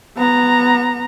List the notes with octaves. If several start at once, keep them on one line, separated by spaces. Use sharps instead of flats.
B3 A#5